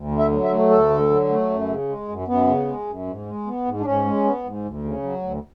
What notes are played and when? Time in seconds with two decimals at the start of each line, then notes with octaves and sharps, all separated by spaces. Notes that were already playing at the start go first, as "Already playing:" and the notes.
Already playing: D2
0.11 D3
0.19 E5
0.32 F#3
0.44 E5
0.51 A3
0.70 D2 A4
0.90 D3
1.10 F#3
1.29 A3
1.50 F#2
1.69 C#3
1.89 G#3
2.08 F#2
2.27 F#2 B3
2.47 C#3
2.67 G#3
2.87 F#2
3.07 G#2
3.26 G#3
3.46 B3
3.65 G#2
3.81 D4
3.85 G#2 C#4
4.05 G#3
4.24 B3
4.44 G#2
4.65 D2
4.84 C#3
5.03 F#3
5.22 D2